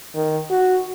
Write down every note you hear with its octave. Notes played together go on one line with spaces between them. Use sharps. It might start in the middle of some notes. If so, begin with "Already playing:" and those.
D#3
F#4